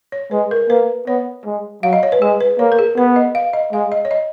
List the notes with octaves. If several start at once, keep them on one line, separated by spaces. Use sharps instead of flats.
C#5
G#3 B4
A#4
A#3 B4
B3 C#5
G#3
F#3 F5
D#5
C#5
B4
G#3 G#4
B4
A#3 C#5
A#4
G#4
B3 B4
D#5
F5
D#5
G#3 F5
D#5
C#5
D#5